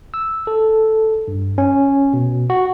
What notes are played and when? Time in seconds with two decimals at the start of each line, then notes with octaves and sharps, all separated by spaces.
0.14 E6
0.47 A4
1.28 G2
1.58 C#4
2.13 B2
2.50 F#4